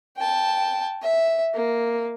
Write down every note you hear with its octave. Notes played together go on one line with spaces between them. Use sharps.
G5 A5
E5
A#3